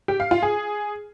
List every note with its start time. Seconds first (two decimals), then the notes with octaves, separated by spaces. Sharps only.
0.08 G4
0.20 F5
0.31 F4
0.42 G#4